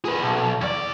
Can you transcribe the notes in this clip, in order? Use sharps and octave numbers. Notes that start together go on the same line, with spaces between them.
G#4 B4
B1
E2 D5